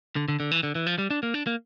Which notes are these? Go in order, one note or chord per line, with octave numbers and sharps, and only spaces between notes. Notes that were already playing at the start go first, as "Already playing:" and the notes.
D3
D3
D3
E3
D3
E3
F3
G3
D4
A#3
D4
A#3